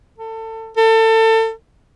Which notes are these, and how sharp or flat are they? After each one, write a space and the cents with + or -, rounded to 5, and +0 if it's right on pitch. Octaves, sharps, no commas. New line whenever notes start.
A4 +25
A4 +30